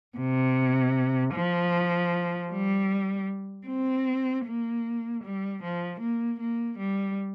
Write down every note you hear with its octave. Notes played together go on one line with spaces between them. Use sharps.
C3
F3
G3
C4
A#3
G3
F3
A#3
A#3
G3